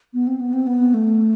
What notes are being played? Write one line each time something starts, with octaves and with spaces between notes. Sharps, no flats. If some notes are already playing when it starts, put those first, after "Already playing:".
B3
C4
B3
C4
B3
A3